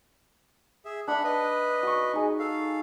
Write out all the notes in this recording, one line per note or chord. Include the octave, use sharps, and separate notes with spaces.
G#4 E5
D4 E5 F#5 B5
B4 D#5
F#4 C#6
D#4 G#4
A4 F5